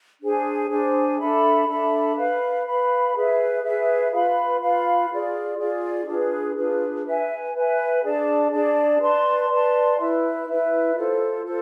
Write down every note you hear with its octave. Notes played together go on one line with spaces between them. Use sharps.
D4 G#4 C5 G#5
D4 G#4 C5 G#5
D4 A4 E5 B5
D4 A4 E5 B5
B4 F5 B5
B4 F5 B5
G#4 B4 E5
G#4 B4 E5
F4 B4 F5 B5
F4 B4 F5 B5
F4 G#4 D5
F4 G#4 D5
D4 F4 G#4 B4
D4 F4 G#4 B4
B4 E5 G#5
B4 E5 G#5
D4 G#4 D5 A5
D4 G#4 D5 A5
B4 D5 A5 C6
B4 D5 A5 C6
E4 B4 E5
E4 B4 E5
F4 A4 C5
F4 A4 C5